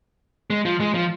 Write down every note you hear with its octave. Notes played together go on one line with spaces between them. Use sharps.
G#3
F3
G#3
F3